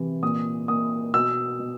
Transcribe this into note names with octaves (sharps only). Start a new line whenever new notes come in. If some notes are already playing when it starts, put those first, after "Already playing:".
Already playing: C3 E3
A#2 D#6
A#2 D#6
B2 E6
B2